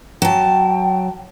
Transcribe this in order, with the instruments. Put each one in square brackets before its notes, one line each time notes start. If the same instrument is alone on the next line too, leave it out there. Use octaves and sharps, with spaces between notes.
[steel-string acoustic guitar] F#3 A5 [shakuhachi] G5